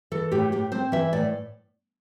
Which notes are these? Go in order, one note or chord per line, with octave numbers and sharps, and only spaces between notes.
E3 A4
A2 G4
A2 G4
C4 C5
E3 E5
A2 D5